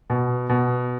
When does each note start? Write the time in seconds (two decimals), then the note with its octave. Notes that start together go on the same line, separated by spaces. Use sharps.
0.10 B2
0.49 B2